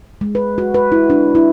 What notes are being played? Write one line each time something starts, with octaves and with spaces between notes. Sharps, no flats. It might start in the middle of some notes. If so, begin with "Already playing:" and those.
G#3
B4
F#4
B4
E4
D4
E4